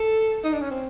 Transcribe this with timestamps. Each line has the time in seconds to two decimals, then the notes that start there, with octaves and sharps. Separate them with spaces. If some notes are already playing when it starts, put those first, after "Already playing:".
Already playing: A4
0.44 D#4
0.53 D4
0.61 C#4
0.71 C4